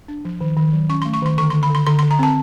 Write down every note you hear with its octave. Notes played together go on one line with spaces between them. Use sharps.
D4
F3
D#3
D#3
F#3
C#4 C#6
A3 C6
C#6
D#3 C6
D3 C#6
D3 C6
B5
D3 C6
D3 C6
D3 C6
A#5
C4 A5